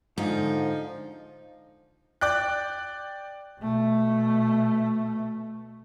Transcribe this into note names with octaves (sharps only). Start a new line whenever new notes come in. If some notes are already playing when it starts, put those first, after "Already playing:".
G#2 D3 F3 D#4
D5 G5 F#6
B2 A3